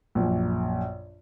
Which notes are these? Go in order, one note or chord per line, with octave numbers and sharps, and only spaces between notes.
A#1 F#2 A#2